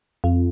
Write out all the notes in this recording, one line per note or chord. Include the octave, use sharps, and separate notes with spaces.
F2